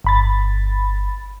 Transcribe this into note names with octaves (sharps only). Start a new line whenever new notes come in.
G1 B5 A6